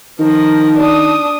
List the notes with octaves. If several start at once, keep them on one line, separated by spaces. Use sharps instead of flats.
D#3 F3 A#4
D4 D#6